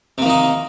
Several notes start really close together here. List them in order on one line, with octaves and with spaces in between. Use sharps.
C3 A#3 D#3 D#4